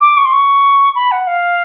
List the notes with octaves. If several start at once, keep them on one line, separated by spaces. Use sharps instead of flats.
D6
C#6
C6
C#6
B5
F#5
F5